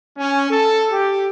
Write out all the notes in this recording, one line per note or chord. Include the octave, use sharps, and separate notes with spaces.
C#4
A4
G4